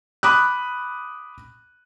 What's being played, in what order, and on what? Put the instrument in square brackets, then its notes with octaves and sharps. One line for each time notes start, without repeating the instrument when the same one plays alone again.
[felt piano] B5 D6 D#6 F#6